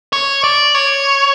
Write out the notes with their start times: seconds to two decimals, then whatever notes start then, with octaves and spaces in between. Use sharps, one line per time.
0.13 C#5
0.44 D5
0.74 C#5